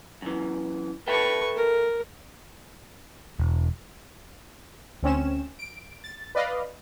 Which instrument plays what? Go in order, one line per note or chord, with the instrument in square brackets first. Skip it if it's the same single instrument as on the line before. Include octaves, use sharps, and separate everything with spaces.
[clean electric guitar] F#2 E3
[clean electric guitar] A4 E5 G5 [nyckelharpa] B4 C#6
[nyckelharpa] A#4
[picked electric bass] E1
[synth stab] D2 C4 C#4 E7
D7
A6
B4 D5 D#5 F5 B5